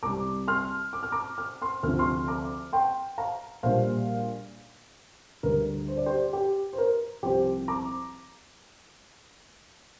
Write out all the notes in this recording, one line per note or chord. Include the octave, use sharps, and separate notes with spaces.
C2 C3 G3 A#5 D6
C6 F6
D6
F6
A#5 D6
F6
C6 F6
D2 C3 F3 F6
C6 F6
A#5 D6
G5 C6
F5 A#5
A#1 A#2 G3 C5 F5
D2 D3 G3 A#4
C5
D5
G4 C5
G4
C5
A#4
C2 C3 F3 G4 C5
A#5 D6